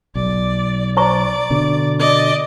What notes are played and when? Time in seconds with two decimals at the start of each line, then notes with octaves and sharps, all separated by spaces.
0.15 B1 D5
0.97 C5 D5 A#5 C#6
1.50 B2 D3
1.99 D5 D#5